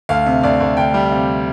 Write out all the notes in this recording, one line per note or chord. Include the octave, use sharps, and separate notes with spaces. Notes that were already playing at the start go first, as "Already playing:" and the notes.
D2 F5
C3
D2 D5
D2
D2 G5
G3
C3 F5